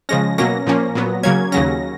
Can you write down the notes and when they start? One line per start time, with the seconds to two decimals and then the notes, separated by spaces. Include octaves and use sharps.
0.09 C#3 F3 G#3 C#4 A#6
0.38 B2 F#3 A#3 C#4 A#6
0.67 A#2 F3 A#3 C#4
0.95 A#2 F#3 B3
1.23 C#3 F#3 A#3 C#4 G#6
1.52 D#2 C#3 F#3 C#4 A#6